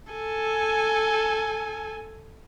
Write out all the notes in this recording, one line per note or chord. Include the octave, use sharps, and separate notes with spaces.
A4 G#5